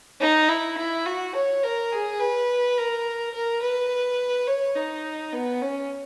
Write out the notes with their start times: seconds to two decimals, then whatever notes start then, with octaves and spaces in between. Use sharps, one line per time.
0.20 D#4
0.49 E4
0.77 E4
1.06 F#4
1.35 C#5
1.63 A#4
1.92 G#4
2.20 B4
2.78 A#4
3.34 A#4
3.62 B4
4.48 C#5
4.76 D#4
5.33 B3
5.62 C#4